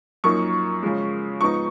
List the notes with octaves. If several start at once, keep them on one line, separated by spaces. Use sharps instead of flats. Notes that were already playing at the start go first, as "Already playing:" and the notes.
F#2 F3 A#3 D#4 C#6
C#3 F3 G#3
G#2 F3 B3 D#4 C#6